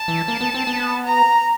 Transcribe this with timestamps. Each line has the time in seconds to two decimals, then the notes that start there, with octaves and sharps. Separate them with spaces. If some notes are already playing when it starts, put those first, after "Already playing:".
Already playing: A5
0.08 E3
0.28 A#3
0.41 B3
0.54 C4
0.67 B3
1.06 A#5